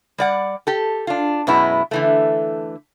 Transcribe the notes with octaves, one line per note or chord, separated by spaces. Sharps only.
G3 D5 F#5
G4 A4
D4 F4
F#2 B2 G#3 B3 E4
D3 E3 A3